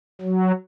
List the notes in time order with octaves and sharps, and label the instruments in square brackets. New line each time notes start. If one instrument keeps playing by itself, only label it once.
[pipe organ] F#3